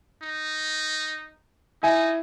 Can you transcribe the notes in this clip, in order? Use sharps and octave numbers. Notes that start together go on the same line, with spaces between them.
D#4
D#4 E4 G#5